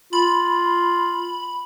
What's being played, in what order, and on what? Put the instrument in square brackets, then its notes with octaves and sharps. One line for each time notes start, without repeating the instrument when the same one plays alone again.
[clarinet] F4 [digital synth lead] B5